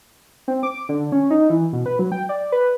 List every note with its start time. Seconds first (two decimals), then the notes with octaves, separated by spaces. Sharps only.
0.48 C4
0.63 D6
0.89 D3
1.12 C#4
1.30 D#4
1.50 E3
1.73 B2
1.86 B4
1.99 F#3
2.12 G5
2.29 D5
2.52 B4